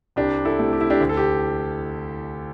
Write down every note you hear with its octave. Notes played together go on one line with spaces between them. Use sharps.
C2 D4 G4
E4 A4
C3 A3
G4
E4
D4 G4
D2
A4
G4